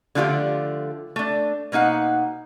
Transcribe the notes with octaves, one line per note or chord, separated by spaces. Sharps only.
D3 F3 A3 F4 G4 D5
A3 D4
B2 A#3 D#4 F#5